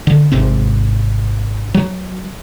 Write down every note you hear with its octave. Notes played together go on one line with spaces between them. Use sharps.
D3
G#1 G#2 C3 C4
F#3